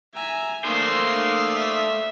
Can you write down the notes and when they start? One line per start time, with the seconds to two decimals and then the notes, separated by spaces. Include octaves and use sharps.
0.15 E5 G#5 A#5
0.64 A3 A#3 C5 D5 F5 C6 D#6
1.54 E5